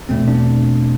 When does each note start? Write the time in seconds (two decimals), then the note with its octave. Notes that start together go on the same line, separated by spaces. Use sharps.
0.09 E2 B2 A3 C4
0.28 D4